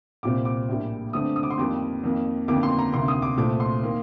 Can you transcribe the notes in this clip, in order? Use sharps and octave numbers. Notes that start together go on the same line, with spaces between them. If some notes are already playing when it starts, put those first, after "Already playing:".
C2 A#2 G3 C4 D6
D6
A#1 A2 G3 A#3
G2 D3 A3 C4 D#6
D#6
D6
C6
F2 D#3 G3 A#3 D6
F2 D#3 A#3
G1 F2 D#3 A#3 D6
C6
A#5
D2 C3 D#3 A#3 C6
D#6
D6
C2 A#2 A3 C4 D6
C6
D#3 A#3